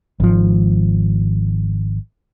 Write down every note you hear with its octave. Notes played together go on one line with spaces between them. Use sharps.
G#1 F3